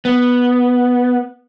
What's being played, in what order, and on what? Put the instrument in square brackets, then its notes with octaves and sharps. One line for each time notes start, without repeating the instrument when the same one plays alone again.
[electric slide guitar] B3